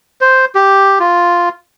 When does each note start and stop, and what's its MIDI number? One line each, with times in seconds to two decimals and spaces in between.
0.21 0.45 72
0.55 0.99 67
0.99 1.49 65